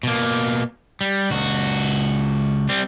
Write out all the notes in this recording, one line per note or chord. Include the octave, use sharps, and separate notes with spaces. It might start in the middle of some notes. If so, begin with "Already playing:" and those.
B2 A#3
G3
C#2 F#4
G3 C4